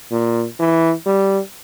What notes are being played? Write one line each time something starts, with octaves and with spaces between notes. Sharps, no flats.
A#2
E3
G3